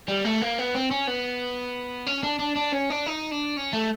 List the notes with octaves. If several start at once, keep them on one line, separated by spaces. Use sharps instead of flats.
G3
A3
A#3
B3
C4
C#4
B3
C#4
D4
D4
D4
C#4
D4
D#4
D4
C#4
A3